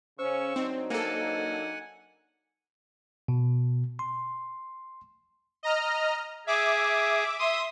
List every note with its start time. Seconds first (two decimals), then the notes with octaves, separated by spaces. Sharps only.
0.19 C#3 C#4 C5 C#6 E6
0.56 F#3 C4 D4 D#4
0.90 A#3 A4 F#5 G#5
3.28 B2
3.99 C6
5.63 D#5 A#5 F6
6.47 G#4 E5 D6
7.39 E5 C6 D#6